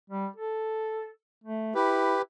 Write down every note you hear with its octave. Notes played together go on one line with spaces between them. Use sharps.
G3
A4
A3
E4 G4 B4